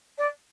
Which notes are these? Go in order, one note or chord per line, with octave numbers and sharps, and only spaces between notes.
D5